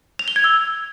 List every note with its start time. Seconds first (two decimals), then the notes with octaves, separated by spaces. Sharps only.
0.19 F7
0.28 G7
0.36 G#6
0.44 E6